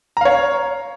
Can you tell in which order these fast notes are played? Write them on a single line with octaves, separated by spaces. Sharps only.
A#5 F5 C#5